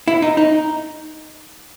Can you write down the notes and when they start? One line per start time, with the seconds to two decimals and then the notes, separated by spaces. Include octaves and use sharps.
0.08 E4
0.22 D#4
0.37 D#4